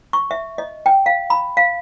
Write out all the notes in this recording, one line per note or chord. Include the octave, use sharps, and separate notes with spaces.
C#6
E5
D#5
G5
F5
B5
F5